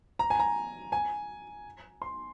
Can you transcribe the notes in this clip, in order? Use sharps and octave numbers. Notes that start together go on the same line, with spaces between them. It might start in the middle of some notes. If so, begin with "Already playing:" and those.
A#5
G#5
A#5
G#5
C6